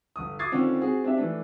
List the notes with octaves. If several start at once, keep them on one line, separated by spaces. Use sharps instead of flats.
G1 D#6
D6 D#6 G#6 A6 C7
D3 D#3 C4 C#4 F4
C4 F#4 G#4
C4 D4 G4 E5
E3 A3 D4